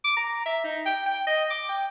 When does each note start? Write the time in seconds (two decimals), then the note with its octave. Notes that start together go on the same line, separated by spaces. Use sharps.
0.04 D6
0.17 A#5
0.46 E5
0.64 D#4
0.85 G5
1.06 G5
1.27 D#5
1.50 D6
1.69 G5